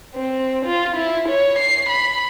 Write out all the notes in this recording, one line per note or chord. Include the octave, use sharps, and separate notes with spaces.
C4
F4
E4
C#5
C7
B5